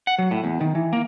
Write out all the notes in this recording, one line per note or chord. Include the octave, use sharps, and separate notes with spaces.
F#5
F#3
A2
E2
D#3
E3
A#3